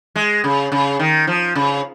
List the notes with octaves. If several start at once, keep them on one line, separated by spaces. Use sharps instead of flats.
G#3
C#3
C#3
D#3
F3
C#3